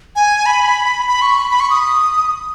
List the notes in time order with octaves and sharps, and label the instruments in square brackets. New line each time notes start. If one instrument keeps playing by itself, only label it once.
[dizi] G#5
B5
B5
C#6
B5
B5
C#6
D#6